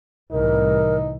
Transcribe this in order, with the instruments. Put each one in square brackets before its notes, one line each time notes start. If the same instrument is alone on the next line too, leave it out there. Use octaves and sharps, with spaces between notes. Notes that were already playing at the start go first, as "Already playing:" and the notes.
[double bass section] C2 A2 E3 [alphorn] D#4 [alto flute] A#4